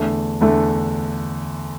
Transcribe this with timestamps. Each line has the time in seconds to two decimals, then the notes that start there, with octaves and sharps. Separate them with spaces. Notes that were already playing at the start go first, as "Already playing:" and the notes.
Already playing: E2 D3 A3
0.41 E2 D3 A3